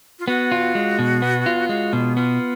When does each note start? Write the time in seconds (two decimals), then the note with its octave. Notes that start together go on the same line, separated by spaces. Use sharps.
0.19 F4
0.27 B3 F#4
0.52 F4
0.75 G#3
0.99 B2
1.22 B3
1.46 F4
1.69 G#3 F#4
1.93 B2 F4
2.16 B3 F4